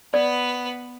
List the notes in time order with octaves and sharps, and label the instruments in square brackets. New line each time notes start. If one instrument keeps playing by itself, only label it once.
[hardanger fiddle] B3 B4 [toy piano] D5